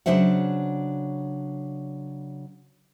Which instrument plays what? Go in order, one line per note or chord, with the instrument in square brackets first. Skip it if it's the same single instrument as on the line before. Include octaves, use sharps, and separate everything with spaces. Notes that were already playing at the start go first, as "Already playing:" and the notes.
[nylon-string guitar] C#3 F#3 D4 C5 E5 F#5